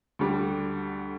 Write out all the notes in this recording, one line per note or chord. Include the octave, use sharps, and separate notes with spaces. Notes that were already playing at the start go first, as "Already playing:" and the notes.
D2 D3 G3